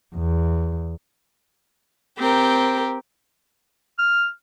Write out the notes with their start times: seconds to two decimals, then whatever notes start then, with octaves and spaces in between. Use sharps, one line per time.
0.16 E2
2.17 C4 G4 A#4
3.99 F6